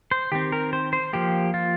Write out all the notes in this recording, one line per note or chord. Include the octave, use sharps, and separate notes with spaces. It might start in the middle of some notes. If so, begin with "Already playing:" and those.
C5
D#3 C4 G4
A#4
C5
C5
F3 A#3 G4
F4